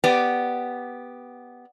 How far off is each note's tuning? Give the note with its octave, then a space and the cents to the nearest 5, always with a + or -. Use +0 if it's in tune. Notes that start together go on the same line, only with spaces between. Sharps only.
B3 +0 G4 +0 D5 +0